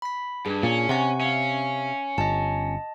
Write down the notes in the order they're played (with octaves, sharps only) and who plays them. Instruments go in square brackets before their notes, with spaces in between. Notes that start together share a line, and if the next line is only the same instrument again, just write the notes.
[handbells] B5 B6
[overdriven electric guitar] G2 [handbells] D4 G#4
[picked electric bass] A#2 [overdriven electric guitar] C#4
[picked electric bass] C3 [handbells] F#5 G#5 C#6
[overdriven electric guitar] C#4 [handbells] E5 F5
[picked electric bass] G1 [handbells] D#5 A5